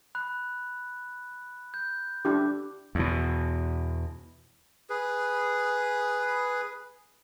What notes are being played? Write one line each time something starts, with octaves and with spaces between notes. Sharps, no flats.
B5 F#6
G6
D4 E4 G4 D6
E2 B2
G#4 B4